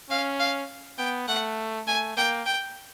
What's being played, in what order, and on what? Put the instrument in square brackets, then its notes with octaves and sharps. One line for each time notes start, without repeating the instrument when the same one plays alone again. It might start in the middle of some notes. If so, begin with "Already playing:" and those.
[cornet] C#4 [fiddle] F5
[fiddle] F5
[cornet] B3 [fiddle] G5
[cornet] A3 [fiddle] F#5
[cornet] A3 [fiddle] G#5
[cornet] A#3 [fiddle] G5
[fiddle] G5